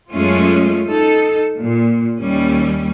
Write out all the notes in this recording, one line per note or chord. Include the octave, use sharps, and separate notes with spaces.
F#2 G#3 A3 C#4 F4
D#4 A4
A#2
D#2 G3 C#4